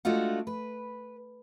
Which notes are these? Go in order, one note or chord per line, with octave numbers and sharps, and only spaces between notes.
G#3 A3 D4 F4 F#4
B4